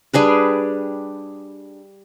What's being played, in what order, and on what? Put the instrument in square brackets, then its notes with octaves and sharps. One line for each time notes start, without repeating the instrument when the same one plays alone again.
[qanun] G3 D4 G#4 B4